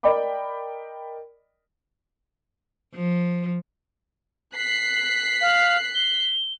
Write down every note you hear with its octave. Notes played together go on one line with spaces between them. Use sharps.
A#4 D5 D#5 G5 B5 D6
F3
F#6 B6 C7
F5
G7